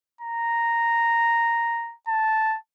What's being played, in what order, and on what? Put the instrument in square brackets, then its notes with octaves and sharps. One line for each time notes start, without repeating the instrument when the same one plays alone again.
[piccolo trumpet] A#5
A5